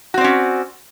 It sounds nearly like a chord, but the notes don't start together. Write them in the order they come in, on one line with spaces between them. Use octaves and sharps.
F#4 C4 D5 C#4